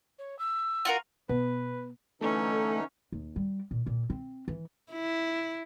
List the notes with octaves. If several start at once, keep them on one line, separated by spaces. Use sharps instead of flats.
C#5
E6
F4 F#4 A#4
B2 B3 B4
D3 E3 A3 C#4 D#4 A4
D#2
G3
A#2
A#2
C4
E3
E4